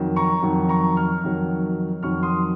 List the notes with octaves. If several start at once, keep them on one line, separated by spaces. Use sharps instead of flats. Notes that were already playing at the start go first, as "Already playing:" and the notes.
Already playing: F2 D#3 F#3
A#5 C#6
F2 D#3 F#3
A#5 C#6
C#6 F6
F2 D#3 F#3
F2 D#3 F#3 C#6 F6
C6 D#6